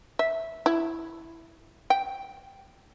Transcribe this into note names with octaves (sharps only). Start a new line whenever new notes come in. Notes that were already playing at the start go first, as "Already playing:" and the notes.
E5
E4
G5